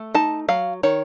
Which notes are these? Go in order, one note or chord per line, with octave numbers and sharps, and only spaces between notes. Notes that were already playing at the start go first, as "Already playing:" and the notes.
Already playing: A3
D#4 A5
F#3 F5
D#3 C#5